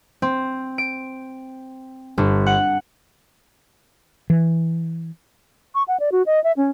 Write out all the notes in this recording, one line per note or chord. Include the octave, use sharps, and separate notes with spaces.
C4
D7
G1
F#5
E3
C#6
F#5
D5
F#4
D#5
E5
C#4